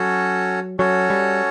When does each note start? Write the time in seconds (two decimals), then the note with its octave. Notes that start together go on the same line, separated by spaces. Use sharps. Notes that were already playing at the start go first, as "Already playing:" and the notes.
Already playing: F#3 C#4 F#4 A4 C#5
0.79 F#3 C#4 F#4 A4 C#5
1.10 G3